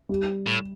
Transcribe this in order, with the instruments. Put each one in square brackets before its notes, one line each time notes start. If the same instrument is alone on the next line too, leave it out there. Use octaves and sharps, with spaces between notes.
[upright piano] G3
[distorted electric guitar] A2